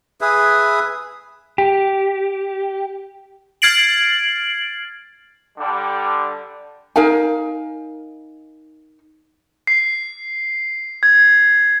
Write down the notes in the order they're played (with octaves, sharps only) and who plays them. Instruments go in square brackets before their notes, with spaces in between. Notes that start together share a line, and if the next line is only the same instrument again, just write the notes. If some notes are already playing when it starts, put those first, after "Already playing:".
[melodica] G#4 B4 E5
[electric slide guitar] G4
[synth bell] F6 G#6 A6 C7 D7 F#7
[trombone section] D3 G3
[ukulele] D#4 A#4 F5 G#5
[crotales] C7
G#6